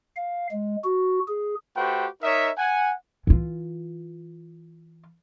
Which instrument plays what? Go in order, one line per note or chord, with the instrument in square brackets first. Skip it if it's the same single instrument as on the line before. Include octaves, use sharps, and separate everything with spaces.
[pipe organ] F5
G#3
F#4
G#4
[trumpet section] A3 F#4 G4 B4 C5 G5
D#4 A#4 C#5 D#5 E5
F#5 G#5
[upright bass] E3 F4